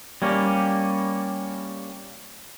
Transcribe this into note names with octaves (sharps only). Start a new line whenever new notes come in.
G3 A#3 C#4